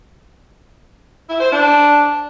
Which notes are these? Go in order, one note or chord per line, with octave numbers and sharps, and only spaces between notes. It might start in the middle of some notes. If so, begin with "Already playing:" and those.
E4
C5
D4